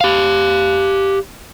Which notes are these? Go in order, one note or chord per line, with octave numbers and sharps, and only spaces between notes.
G4 F5